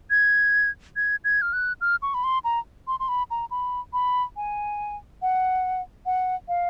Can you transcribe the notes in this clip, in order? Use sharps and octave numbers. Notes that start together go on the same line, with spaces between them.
G#6
G#6
G#6
F6
F#6
F6
C#6
B5
C6
A#5
C6
C6
B5
A#5
B5
B5
G#5
F#5
F#5
F5